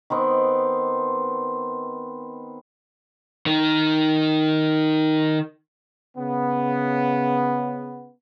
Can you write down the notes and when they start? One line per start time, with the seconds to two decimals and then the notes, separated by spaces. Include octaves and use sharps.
0.10 D#3 B3 C4
3.46 D#3 D#4
6.17 C#3 B3